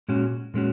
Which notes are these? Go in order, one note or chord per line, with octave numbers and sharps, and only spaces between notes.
A#2 G#3 C#4 F#4
A#2 G#3 C#4 F#4